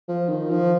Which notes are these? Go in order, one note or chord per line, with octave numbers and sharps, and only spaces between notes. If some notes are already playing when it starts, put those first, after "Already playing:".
F3
D#3
F3